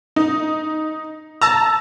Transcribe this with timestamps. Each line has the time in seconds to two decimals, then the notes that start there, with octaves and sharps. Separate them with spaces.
0.16 D#4
1.42 A5 A#5 E6